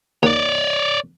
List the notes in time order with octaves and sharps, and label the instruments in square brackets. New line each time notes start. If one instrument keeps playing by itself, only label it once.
[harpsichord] D#2 [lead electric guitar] C#5 D5